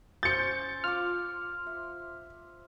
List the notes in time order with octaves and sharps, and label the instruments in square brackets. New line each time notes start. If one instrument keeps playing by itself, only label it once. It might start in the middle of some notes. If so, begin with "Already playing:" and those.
[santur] C#4 C5 E6 [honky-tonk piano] G6 C#7 [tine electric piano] A6
[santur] F4 D6 [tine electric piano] F6
[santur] E5